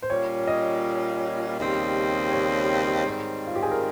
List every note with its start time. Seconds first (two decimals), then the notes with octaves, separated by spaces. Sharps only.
0.02 C5
0.10 A#2 G3 C#4 F4 C#5
0.47 D#5
1.59 D#2 C#3 G3 C4
2.31 C#5
3.06 G#2 D#3 G3 C4
3.47 F4
3.55 G4
3.63 G#4
3.71 A#4